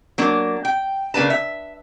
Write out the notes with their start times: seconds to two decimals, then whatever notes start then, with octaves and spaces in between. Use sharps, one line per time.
0.18 F#3 A#3 D4
0.65 G5
1.14 C#3 A#3 D4 B4 A5
1.30 E5